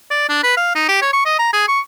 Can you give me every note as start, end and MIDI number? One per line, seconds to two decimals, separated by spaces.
0.10 0.24 74
0.29 0.40 62
0.43 0.54 71
0.57 0.75 77
0.75 0.86 63
0.89 0.99 67
1.02 1.09 73
1.13 1.21 85
1.25 1.35 75
1.39 1.51 82
1.53 1.67 68
1.68 1.80 85